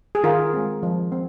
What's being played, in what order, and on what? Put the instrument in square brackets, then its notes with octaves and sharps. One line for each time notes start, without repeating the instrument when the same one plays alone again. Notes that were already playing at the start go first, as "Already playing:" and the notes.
[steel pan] G#4
D#3 F4 A#4
G#3 C4
F3
C4